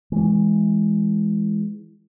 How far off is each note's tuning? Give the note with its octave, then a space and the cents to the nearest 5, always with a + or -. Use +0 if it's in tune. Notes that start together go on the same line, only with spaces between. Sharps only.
E3 +0 G#3 +0